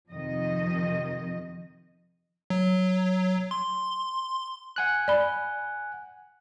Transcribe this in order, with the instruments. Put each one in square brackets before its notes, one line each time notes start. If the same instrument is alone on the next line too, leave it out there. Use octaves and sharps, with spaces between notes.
[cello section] F2 C3 D#3 F3 D#5
[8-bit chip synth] F#3
C6
[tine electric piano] F#5 G#5 F#6
[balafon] D5 B5